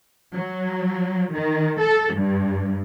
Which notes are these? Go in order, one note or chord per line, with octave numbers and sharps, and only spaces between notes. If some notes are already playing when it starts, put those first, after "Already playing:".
F#3
D#3
A4
G2